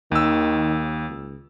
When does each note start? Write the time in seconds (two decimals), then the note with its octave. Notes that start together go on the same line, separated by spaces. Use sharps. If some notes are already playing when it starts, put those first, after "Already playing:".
0.12 D#2 D#3 E6
1.08 C#2